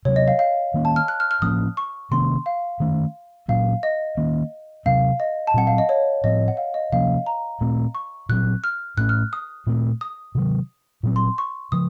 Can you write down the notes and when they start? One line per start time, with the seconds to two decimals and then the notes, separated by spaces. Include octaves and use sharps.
0.05 C3 F#3 C4 C#5
0.16 D#5
0.28 F5
0.39 F5
0.74 D#3 A#3 C#4
0.85 A5
0.96 F6
1.08 F#6
1.20 F6
1.31 F6
1.42 A2 F3 A#3 C#4 D#6
1.77 C#6
2.11 C3 D#3 A#3 C#4 C6
2.46 F5
2.80 D#3 A3 C#4
3.48 A#2 F#3 A#3 C#4 F5
3.83 D#5
4.17 D#3 A#3 C#4
4.86 C3 F#3 C4 F5
5.20 D#5
5.47 A5
5.54 A#2 F#3 C4 F#5
5.67 F5
5.78 D#5
5.89 C#5
6.24 A2 F3 C4 D#5
6.48 F#5
6.57 F5
6.74 D#5
6.92 C3 F3 A#3 C#4 F5
7.26 A#5
7.61 A#2 A3 C4
7.95 C#6
8.29 A#2 F#3 C4 F#6
8.64 F6
8.97 A2 A3 C#4 F#6
9.09 F6
9.33 D#6
9.67 A#2 A3 C4
10.01 D#6
10.35 C3 D#3 F#3
11.03 A#2 F#3 C4
11.16 C6
11.38 C#6
11.72 C#3 F3 D#6